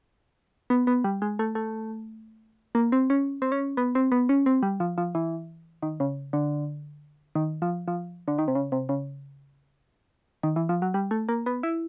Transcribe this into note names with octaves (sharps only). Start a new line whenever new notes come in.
B3
B3
G3
G#3
A3
A3
A#3
C4
C#4
C4
C#4
B3
C4
B3
C#4
C4
G3
F3
F3
E3
D#3
C#3
D3
D#3
F3
F3
D3
D#3
C3
C#3
C3
C#3
D#3
E3
F3
F#3
G3
A3
A#3
B3
E4